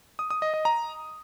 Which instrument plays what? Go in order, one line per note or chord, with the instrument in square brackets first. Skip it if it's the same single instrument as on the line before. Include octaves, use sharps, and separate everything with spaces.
[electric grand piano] D#6
D#6
D#5
D#5
A#5